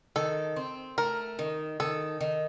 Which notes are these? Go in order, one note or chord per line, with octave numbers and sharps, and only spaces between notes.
D#3 A4
C4
A3 A#4
D#3
D#3 A4
D#3